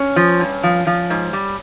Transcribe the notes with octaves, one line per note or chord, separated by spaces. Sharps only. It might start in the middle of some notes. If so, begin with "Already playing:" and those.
Already playing: C#4
F3
G2
F3
F3
G#2
G3